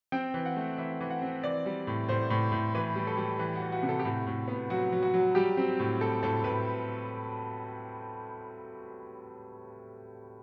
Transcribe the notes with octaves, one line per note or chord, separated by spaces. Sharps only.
C4 G5
E3
F#5
A3
E3 E5
E3
F#5
C4
E3 D5
G3
A2
A2 C5
A2
A2
E3 B4
G3
A4
G3
E3
F#4
E3
F#4
C3
A4
G4
A2 F#4
A2
B3
F#3 F#4
F#3
F#4
F#3
G3 G4
C4
A2
A2 A4
A2 A4
A2 B4